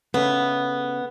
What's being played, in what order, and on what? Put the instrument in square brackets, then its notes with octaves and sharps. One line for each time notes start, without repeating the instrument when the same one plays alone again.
[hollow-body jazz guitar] C#3 A3 [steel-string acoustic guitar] B3